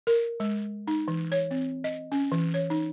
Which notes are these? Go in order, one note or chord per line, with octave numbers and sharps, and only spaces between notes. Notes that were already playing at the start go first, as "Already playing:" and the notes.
A#4
G#3
D#4
E3
C#5
C4
D#5
C#4
E3
C#5
D#4